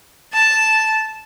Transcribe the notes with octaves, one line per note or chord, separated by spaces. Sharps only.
A5